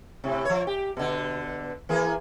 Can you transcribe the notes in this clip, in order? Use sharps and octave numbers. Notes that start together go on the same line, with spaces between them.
A2 C3
F3 C#5
G4
B2 D3
E3 A#3 G#4